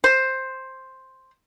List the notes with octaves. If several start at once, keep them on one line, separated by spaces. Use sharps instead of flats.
C5